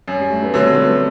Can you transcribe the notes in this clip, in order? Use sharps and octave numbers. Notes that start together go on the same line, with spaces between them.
F#2
G3
A3
B3
D3 F#3 A3 C4
G3 B3